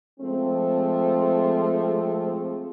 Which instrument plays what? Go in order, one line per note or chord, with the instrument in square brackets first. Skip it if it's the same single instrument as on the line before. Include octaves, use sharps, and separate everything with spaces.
[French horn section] F3 G#3 A3 C4